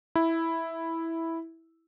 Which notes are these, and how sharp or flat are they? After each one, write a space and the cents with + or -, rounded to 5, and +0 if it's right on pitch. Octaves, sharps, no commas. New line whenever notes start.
E4 -5